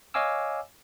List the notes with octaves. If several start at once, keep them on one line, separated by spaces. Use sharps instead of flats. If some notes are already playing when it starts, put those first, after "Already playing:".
C#5 D#5 F5 G#5 D6 E6